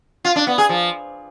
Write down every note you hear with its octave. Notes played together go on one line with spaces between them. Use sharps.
F4
D4
B3
G#4
F3